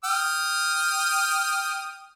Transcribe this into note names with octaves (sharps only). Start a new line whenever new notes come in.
G5 D#6 F6